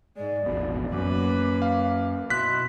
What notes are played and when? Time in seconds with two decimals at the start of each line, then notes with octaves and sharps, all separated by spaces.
0.16 G#2 G#3 D5
0.46 E1 A1 B2 F3
0.93 F#2 A#3 C#4 B4 D6
1.62 F5
2.30 B2 E4 C6 F#6 B6